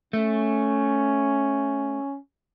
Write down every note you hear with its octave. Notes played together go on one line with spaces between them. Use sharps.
A3 C#4